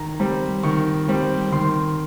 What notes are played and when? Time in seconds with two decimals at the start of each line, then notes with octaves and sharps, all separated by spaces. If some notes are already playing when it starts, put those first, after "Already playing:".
Already playing: D#3 A#5
0.20 G3 C4
0.63 D#3 C#6
1.08 G3 C4
1.52 D#3 C6